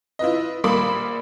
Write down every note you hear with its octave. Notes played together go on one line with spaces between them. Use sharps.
E4 F4 B4 D#5
A#1 G3 A#3 B5 D6